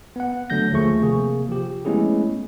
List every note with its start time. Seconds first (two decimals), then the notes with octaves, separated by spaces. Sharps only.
0.16 B3 F#5
0.50 D3 F#3 A3 G6 A#6
0.72 D#2 F3 A3 G#4 C#6
1.02 C3 A#3 G#4
1.49 F3 G4
1.85 G#3 A3 B3 C#4 E4 G#4